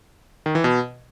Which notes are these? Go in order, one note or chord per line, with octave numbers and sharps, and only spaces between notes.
D#3
E3
B2